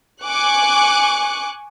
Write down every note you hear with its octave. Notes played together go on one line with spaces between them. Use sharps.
G#5 C#6 D6 F#6